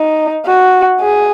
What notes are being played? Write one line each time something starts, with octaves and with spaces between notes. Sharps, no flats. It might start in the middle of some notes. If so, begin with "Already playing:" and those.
Already playing: D#4
F#4
G#4